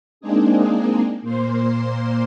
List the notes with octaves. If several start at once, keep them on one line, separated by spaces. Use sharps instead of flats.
G#3 A#3 C4 D4 D#4 G#4
A#2 A#3 C5 C6